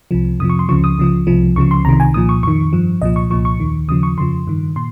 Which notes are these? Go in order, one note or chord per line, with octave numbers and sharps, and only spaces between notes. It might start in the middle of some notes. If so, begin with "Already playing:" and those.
C2 C3 F3
F2 C3 F3 D#6
C#6
C6
C#2 C#3 F3 C#6
D#6
C#2 C#3 F3
C2 C3 F3
C#2 C#3 F3 C#6
C6
C2 C3 D#3 A#5
G#5
C2 A#2 F3 D#6
C#6
F2 D#3 C#6
G2 F3
C2 A#2 F3 D#5
C#6
C2 A#2 F3 C#6
C#6
D#2 D#3
D#2 C#3 F3 D#6
C#6
F2 C#3 F3 C6
G2 D#3
A#2 C6